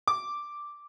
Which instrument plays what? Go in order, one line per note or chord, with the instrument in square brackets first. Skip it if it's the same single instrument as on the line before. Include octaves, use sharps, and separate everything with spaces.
[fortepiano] D6